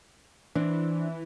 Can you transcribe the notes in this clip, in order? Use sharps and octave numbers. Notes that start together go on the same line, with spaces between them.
E3 C4 D4